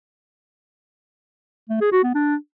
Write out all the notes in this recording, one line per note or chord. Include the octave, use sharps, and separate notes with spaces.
A3
G#4
F#4
B3
D4